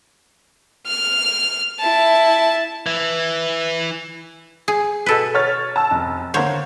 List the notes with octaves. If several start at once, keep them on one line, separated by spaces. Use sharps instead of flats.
F6
E4 A5
E3
G#4
B2 A4 B4
C#5 F6 A6
A5 E6
F1
D3 A#3 C5 C#5